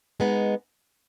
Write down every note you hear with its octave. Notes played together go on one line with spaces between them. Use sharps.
G#3 B3 D#4